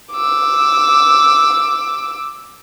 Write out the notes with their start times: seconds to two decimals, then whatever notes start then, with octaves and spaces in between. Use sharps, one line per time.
0.12 D6 E6